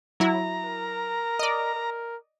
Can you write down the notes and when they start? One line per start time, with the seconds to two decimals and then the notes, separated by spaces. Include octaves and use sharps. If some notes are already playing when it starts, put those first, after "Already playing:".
0.20 F#3 E4 A#5
0.64 A#4
1.39 D5 D#5
1.75 A#4